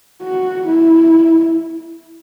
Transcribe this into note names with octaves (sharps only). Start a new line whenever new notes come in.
F#4
E4